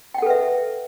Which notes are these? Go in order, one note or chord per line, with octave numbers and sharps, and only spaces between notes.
A4 B4 E5 F#5 G5